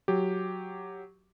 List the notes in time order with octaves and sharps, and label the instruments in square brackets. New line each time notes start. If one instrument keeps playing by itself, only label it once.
[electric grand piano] F#3 G4